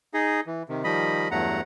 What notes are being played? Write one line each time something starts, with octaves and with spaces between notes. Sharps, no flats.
D#4 G#4 D#5
E3
C3 D#3
D#3 F3 G3 D#5 B5
E2 G2 F#3 A3 F#5 A#5